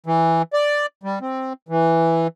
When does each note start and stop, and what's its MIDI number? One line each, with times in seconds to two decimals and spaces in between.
0.06 0.42 52
0.53 0.86 74
1.03 1.19 55
1.21 1.53 60
1.69 2.27 52